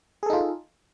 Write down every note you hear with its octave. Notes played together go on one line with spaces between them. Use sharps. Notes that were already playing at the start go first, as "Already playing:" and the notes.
D#4 F4 G#4 A4